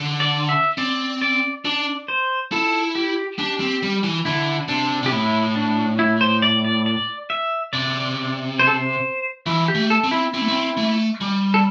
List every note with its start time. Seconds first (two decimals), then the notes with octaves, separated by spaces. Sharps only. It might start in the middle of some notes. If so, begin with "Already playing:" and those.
Already playing: D3
0.20 D5
0.49 E5
0.78 C4 D5
1.22 D5
1.65 D4 D5
2.08 C5
2.52 E4 A4
2.95 G4
3.39 D4 G4
3.60 C4
3.83 G3
4.03 E3
4.25 D3 E4
4.68 C3 D4
5.03 C3 G4
5.12 A2 E4
5.56 D4
5.99 E4
6.21 C5
6.42 D5
6.65 D5
6.86 D5
7.30 E5
7.73 C3 D5
8.59 C5
8.67 A4
8.75 C5
9.46 E3 E4
9.68 G4
9.75 A3
9.90 A4
10.04 C4
10.11 E4
10.34 C4 E4
10.41 A3
10.48 C4
10.77 A3
11.21 G3
11.54 A4